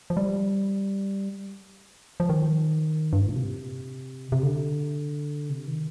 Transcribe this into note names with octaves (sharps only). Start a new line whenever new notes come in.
F3
G3
F3
D#3
G2
G#2
A#2
C3
C3
D3
C3
D#3